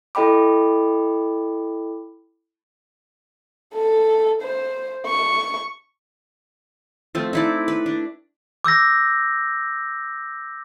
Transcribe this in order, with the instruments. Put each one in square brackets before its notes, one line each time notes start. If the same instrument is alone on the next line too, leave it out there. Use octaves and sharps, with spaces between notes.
[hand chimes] E4 A4 D#5 G5 B5 D6
[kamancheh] A4
C5
C#6
[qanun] F3 A3 C4
D#4 E4 D5
B4
D4
[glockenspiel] D6 E6 G6 A#6